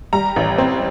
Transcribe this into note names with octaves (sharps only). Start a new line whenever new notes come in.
G3 A#5
A1
C4